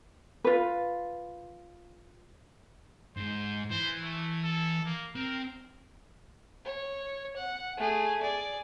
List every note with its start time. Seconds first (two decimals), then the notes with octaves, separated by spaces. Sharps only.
0.44 F4 B4
3.17 G#2 C5
3.71 E3 C5
4.02 A3
4.44 A4
4.85 A#3
5.15 C4 A#4
6.65 C#5
7.37 F#5
7.77 A3 G#4
8.22 G#4 D5